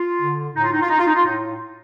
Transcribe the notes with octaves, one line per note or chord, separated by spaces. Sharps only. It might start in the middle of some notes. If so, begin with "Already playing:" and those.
Already playing: F4
D3
A2 D#4
F4
D#4
F4
D#4
F4
D#4
F4
A2 D#4